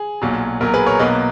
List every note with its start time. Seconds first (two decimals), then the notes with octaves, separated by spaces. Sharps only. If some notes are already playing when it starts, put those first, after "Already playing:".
Already playing: G#4
0.22 B1 A#2 F#3
0.60 B1 A#2 F#3 A#4
0.74 G#4 B4
0.86 A#4 C#5
0.99 B1 B2 F#3 A#3 B4 D#5